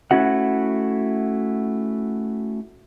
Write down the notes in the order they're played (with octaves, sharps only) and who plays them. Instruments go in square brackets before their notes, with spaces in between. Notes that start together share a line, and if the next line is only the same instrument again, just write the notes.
[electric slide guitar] A3 C#4 E4 F#4 F#5